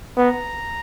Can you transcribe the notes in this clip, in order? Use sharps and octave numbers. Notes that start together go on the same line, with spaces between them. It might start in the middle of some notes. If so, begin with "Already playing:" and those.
B3 A#5